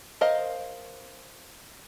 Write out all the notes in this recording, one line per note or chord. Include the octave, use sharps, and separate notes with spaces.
A#4 C5 D#5 F5